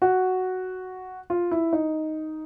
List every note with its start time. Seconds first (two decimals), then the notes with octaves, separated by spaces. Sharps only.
0.02 F#4
1.30 F4
1.51 E4
1.73 D#4